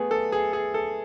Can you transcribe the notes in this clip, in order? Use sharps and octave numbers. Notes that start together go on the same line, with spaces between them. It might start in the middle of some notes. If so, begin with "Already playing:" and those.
Already playing: A3 B3 G#4
A4
G#4
G#4
A4